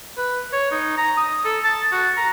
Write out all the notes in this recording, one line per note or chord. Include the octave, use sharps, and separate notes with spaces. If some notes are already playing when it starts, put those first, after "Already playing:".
B4
C#5
D#4
A#5
D#6
A4
A5
F#4
A#5